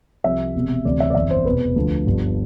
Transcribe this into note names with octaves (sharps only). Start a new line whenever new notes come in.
C2 C3 F3 E5
E1 E2 C3
D2 C3 E3 D5
E5
D5
G1 F2 E3 E5
C5
F1 E2 B2 B4
D2 D3 F3
G1 G2 F3